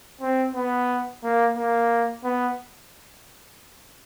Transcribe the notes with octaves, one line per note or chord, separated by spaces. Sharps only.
C4
B3
A#3
A#3
B3